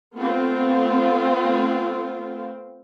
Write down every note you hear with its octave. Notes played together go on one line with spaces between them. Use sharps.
A3 B3 C4 F4